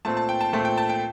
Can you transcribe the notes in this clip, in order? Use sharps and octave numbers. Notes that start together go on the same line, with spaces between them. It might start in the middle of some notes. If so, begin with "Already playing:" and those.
A#2 A3 C4 A5
A5
G5
A5
A#2 A3 C4 A5
G5
A5
G5